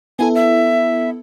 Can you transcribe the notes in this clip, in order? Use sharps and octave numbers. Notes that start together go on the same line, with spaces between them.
B3 E4 A4 G#5
E5